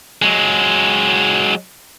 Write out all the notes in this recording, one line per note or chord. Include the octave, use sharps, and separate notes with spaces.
F#3 G#3